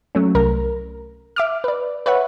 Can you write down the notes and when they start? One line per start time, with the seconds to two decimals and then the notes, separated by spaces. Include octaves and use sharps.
0.15 F#3 A3 C#4
0.35 C2 A#4 A#5
1.36 E5 D6 F6
1.64 B4 D5
2.06 B4 C#5 E5 F#5